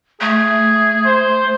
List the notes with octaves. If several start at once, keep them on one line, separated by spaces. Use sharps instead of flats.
A3 G#4
C5